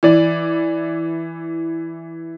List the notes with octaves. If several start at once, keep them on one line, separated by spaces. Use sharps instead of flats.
E3 D5